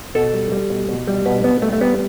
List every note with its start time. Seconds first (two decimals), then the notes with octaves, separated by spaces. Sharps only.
0.15 B2 A4
0.34 G3
0.52 G3
0.70 B2
0.89 B2
1.07 G3
1.26 B2 B4
1.44 B2 B3
1.62 G3 A3
1.73 A3
1.81 G3 B3